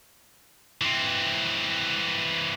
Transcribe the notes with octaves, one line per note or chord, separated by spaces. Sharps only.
E3 C4